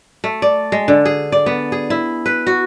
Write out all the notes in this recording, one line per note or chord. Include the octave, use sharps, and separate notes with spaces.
A3
D5
G#3
D3
G#4
D5
B3
G#4
E4
B4
F#4